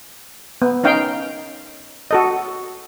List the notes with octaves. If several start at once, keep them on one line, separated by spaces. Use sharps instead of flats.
B3
C#4 D#4 F5 G5
F#4 A4 D#5